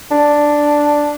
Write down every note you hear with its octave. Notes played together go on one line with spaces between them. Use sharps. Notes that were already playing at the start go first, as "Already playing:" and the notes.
D4